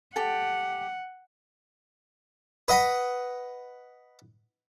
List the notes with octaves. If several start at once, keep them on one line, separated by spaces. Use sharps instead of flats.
G4 A4 F#5
B4 D#5 F#5 B5